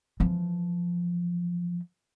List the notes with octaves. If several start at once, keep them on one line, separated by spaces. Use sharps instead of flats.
E3 F3